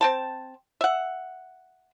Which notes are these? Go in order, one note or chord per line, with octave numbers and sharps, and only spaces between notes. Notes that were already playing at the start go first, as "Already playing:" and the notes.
C4 G5 A5
E5 F#5